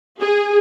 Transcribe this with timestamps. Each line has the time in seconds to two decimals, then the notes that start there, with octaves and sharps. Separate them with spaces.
0.21 G#4